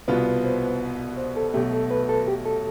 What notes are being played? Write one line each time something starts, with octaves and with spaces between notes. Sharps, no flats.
C2 B2 B3 F4 B4
C5
C5
A4
B1 B2 A3 G4
A4
B4
A4
G4
A4